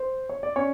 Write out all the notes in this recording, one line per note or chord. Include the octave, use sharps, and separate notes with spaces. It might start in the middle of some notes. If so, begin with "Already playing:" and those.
Already playing: C5
C#5
D5
C#4 C#5